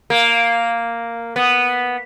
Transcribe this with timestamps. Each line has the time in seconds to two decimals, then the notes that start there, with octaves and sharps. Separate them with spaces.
0.10 A#3
1.36 B3